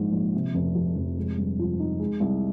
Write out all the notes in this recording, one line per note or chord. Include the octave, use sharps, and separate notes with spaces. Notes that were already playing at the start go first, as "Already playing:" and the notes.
Already playing: A#1 G#2
A#1
C3
F1
F2
F1
G#3
G2
F3
D#4
G#3
C2